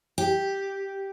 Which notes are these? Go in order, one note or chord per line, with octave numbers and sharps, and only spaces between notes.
G4